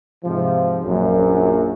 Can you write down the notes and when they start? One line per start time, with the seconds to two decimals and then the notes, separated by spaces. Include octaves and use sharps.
0.24 G#2 C3 F3
0.83 A#1 F#2